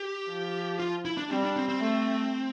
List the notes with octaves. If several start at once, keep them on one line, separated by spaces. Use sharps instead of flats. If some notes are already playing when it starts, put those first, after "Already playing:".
Already playing: G4
F3
F4
E4
D4
G3 C4
D4
C4
C4
A3